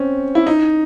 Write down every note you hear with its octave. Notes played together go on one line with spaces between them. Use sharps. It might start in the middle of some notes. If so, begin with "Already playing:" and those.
Already playing: C4 C#4
E4
D#4